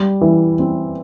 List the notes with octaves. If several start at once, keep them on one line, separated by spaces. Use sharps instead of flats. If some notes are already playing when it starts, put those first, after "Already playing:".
Already playing: G3
E3
C4